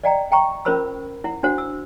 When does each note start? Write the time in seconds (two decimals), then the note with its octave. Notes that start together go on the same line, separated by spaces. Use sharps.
0.04 D5 D#5 F5 G5 A#5
0.31 E5 G5 A#5 C#6
0.65 C#4 F4 A#4 C5 B5 E6
1.24 E4 F#5
1.43 D4 F#4 C5 F#5
1.58 E6